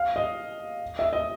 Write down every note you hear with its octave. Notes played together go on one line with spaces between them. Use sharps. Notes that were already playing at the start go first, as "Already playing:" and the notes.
Already playing: F5
D#5
E5
D#5